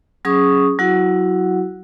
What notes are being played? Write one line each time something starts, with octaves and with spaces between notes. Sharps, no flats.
F#3 C#4 G#4 C#6 D#6
F#3 E4 F#4 F#5